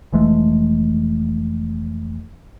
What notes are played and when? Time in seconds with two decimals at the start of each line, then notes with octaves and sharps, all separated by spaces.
0.12 F1 E3 G#3 A3